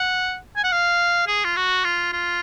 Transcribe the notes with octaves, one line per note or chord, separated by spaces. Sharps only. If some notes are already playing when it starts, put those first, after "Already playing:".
Already playing: F#5
G#5
F#5
F5
G#4
F4
F#4
F4
F4